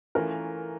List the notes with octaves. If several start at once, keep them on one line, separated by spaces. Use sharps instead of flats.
E3 A3 C#4 F4 A#4